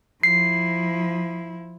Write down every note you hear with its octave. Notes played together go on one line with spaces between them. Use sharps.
F3 E4 C7